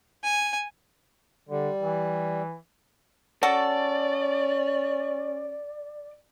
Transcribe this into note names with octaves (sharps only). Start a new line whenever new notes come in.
G#5
D3 G3
E3
C#4 F#4 A4 D5